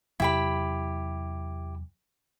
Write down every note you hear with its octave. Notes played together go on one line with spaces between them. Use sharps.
E2 C3 F#3 E4 G4 B5